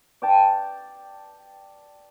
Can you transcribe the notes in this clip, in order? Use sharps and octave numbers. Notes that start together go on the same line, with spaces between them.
D5 G5 A5